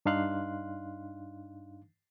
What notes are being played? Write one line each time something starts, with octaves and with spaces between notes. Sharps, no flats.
G2 D4 D#4 F5 C6 F#6